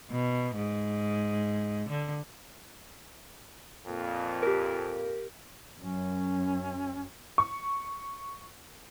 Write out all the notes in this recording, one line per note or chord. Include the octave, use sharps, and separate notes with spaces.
B2
G#2
D3
F2 A#2
G4 A#4
F#2 C#4
C#6